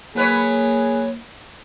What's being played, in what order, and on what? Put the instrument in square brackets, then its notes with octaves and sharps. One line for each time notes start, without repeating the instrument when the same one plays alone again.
[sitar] F#3 B4 C#5 [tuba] A#3 [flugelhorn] G#4